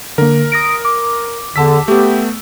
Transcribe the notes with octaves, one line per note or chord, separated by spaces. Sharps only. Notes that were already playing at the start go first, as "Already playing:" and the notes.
D3 A#3 A#4
D#6 A#6 D7
D6
E2 D3 A5 E6 B6
A3 B3 G4